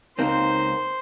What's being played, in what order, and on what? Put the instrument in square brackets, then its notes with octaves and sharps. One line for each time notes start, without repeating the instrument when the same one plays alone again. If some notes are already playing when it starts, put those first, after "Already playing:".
[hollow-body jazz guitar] C#2 A#3 C4 [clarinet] D#4 [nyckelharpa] C5